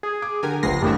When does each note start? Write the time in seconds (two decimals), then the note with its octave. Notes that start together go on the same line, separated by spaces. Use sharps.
0.03 G#4
0.22 D6
0.43 D3 G4 A#4 G#5
0.63 G1 C#2 F3 A#6 C7
0.82 A1 F#2 A2 D3 G3 A#3 E5